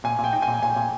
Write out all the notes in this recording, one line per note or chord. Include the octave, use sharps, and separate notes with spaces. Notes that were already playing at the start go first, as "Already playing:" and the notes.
A#2 G#5
A#2 G5
D#4
G#5
A#2
A#2 G#5
A#2